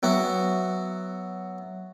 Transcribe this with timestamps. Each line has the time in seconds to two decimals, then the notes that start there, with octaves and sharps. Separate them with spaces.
0.03 F#3 B3 E4 F#4